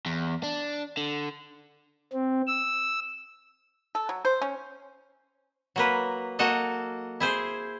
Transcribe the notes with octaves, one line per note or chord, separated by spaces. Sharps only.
E2
D4
D3
C4
E6
A4
F#3
C5
C#4
F#3 A#3 B4
A#3 F#4 A4 D#5
E4 G#4 C5